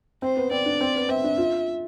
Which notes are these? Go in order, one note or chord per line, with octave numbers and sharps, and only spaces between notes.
C4 C5
B3
C4 D5
D4
C4
B3
C4 E5
D4
F4